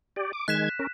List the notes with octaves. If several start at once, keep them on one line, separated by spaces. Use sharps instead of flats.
G4 D5
D6
D#3 G#3 F#6 G#6 B6 E7
C#4 A#4